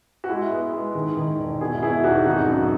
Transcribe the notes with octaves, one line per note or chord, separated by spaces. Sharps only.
F#4
G#3 E4
B3
G#3
D#3
D#3
E1
B2 E4 G#4
B2 E4 G#4
E1 D#4 F#4
G#1 D#4 F#4
F#2